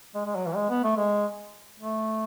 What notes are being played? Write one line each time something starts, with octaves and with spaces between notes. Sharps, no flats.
G#3
G#3
F#3
E3
G#3
B3
A3
G#3
A3